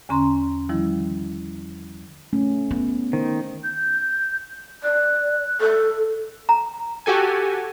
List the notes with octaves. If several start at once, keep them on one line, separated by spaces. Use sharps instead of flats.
E2 D3 C#4 A#5 C6
D#3 F3 G3 E4
A3 C#4
B3 E4
D#3 C5
G6
D5 F#6
A4
A#5
F#4 G4 A4 G#5